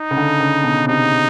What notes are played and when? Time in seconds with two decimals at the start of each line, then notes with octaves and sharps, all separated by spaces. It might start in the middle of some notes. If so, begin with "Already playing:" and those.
Already playing: D#4
0.11 C#3
0.17 D3
0.40 C#3
0.64 B2
0.87 C3 D#4